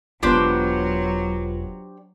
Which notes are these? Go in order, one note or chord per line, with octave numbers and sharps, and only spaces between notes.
E1 F#3 B3 D4 F4 G4 B4 C5